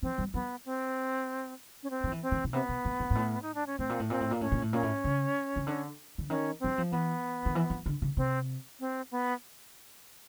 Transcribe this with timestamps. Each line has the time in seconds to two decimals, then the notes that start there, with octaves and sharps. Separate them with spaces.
0.02 F3 C4
0.18 G3
0.34 F#3 B3
0.65 C4
1.83 C#4
1.90 C4
2.04 F3
2.12 E3
2.22 C4
2.32 D#3
2.44 B2
2.53 C3 B3
2.69 B2
2.85 A#2
3.00 A#2
3.10 G#2
3.15 A2
3.42 D#4
3.55 D4
3.67 C#4
3.79 A2 C4
3.89 A#2
4.00 A2
4.10 A#2 C4
4.21 A2
4.31 A#2
4.41 A2 C#4
4.52 A#2
4.62 A2
4.72 A#2 C#4
4.83 A2
5.04 C#3
5.56 C#3
5.67 D3
6.18 D3
6.29 D#3 C#4
6.60 F#3 C4
6.78 F3
6.91 E3 B3
7.46 D#3
7.55 E3
7.70 F3
7.86 D3
8.02 C#3
8.17 C3 C4
8.80 C4
9.11 B3